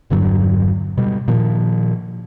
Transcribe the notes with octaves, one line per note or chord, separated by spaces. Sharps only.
E1 G2 D3 F#3
B2 G3
A#2 D#3 F3